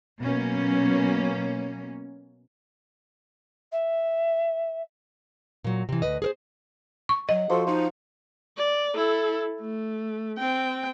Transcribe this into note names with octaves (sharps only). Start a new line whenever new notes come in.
B2 F#3 A#3 C#4
E5
A#2 F#3
C3 E3
D2 B4 D#5
G#4 A#4 C5
C#6
F#3 D#5 F#5
F3 F#4 A4 C5
D#4 F4 D#6
D5
E4 A4
A3
C4 G5